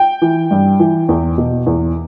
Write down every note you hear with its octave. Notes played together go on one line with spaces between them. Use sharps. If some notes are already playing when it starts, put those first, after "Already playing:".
Already playing: G5
E3
G2
E3
E2
B2
E2